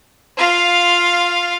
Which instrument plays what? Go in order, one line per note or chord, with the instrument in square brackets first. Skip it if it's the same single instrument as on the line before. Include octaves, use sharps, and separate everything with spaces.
[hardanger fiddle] F4 F5